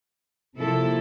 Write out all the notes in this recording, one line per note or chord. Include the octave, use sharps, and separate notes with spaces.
C3 F3 A#3 E4 A4